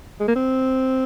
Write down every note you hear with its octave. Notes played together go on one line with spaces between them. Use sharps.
G#3
A#3
C4